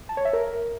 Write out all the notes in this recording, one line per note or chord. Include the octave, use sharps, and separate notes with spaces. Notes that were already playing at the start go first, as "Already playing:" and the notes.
A5
C#5
E5
A#4